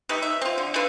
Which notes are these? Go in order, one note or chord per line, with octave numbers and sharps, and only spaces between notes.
A3 D#4 G4 B4
E5
C4 F4
D3
D4 A4 B4 F5